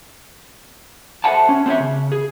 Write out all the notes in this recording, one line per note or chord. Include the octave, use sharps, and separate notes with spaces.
A4 C5 D#5 E5 F#5 A5
C#4
C4 D4 C#5 E5
C#3
G#4